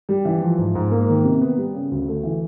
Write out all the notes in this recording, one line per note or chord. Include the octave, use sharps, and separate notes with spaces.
G3
E3
F3
G#2
G#2
A#3
D#3
C3
B3
G3
C#3
D2
A3
E3